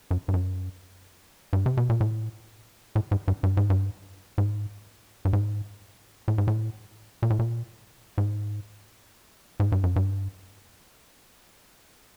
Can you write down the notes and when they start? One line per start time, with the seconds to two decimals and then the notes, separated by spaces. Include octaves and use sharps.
0.11 F#2
0.28 G2
0.34 F#2
1.53 G2
1.66 C3
1.77 B2
1.90 A#2
2.01 A2
2.95 A2
3.11 G#2
3.28 G2
3.43 G2
3.57 G#2
3.70 G2
4.38 G#2
5.25 G2
5.33 G#2
6.28 A2
6.38 G#2
6.48 A2
7.23 A#2
7.30 A2
7.39 A#2
8.18 G#2
9.60 G#2
9.72 G2
9.84 F#2
9.96 G2